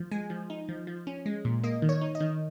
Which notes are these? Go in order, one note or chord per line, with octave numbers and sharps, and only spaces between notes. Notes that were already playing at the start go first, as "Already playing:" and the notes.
Already playing: F3
G#3 G#5
F3
D#4
F3
F3
C#4
G#3
A#2
A#3 D#5
D#3
C#5
D#4
D#5
D#3